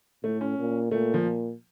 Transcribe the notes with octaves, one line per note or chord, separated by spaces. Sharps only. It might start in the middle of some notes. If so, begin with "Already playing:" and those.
A2 A3
C#4
A#2
A#2 A3
F3